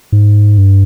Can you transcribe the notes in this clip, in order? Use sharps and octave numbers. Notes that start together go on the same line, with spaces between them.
G#2
G2